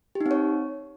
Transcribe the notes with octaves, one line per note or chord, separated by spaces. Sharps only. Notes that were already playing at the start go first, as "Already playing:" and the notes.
G4
D#4
C4
C#5